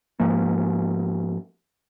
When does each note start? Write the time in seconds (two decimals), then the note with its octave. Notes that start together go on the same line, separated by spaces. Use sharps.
0.20 G#2 F3 A#3